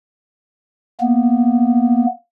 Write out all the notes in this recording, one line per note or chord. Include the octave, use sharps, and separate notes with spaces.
A#3 B3